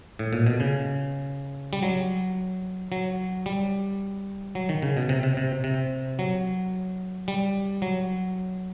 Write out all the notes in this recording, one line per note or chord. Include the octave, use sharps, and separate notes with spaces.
A2
A#2
B2
C#3
G3
F#3
F#3
G3
F#3
D#3
C#3
B2
C3
C3
C3
C3
F#3
G3
F#3